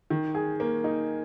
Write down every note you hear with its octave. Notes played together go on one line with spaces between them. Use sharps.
D#3
G#4
A#3
D#4